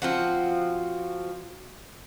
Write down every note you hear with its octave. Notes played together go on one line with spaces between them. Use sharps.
F3 C4 F#4